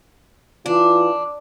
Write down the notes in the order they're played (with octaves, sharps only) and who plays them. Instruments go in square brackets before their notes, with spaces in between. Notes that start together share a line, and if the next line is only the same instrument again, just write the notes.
[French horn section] E3 F4 [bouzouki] D4